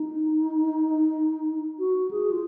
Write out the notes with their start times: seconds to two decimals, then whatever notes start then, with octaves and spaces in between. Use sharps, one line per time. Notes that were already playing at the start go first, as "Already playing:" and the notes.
Already playing: D#4
1.79 F#4
2.11 G#4
2.31 F4